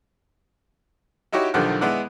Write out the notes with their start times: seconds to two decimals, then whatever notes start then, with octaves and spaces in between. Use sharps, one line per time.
1.33 D#4 E4 F#4 G4 C#5
1.54 B1 D3 D#3 F3 G4 F#5
1.81 G#3 B3 E4 D5 F#5